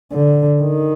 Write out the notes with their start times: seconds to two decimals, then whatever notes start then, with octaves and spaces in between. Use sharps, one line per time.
0.12 D3
0.61 D#3